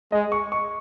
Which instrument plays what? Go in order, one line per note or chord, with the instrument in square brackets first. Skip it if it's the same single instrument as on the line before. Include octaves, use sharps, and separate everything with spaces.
[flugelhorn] G#3 [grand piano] D#5
[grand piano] C#6
C#6